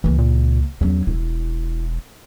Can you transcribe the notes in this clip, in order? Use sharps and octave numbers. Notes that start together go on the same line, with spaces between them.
C#2 E3 A#3
A#2
E2 F#3 C#4
E1 E4